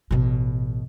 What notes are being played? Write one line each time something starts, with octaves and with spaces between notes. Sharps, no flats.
A1 B2